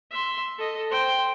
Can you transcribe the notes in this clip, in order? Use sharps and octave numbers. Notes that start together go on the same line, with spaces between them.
E5 C6
A4 D#5
C5 G5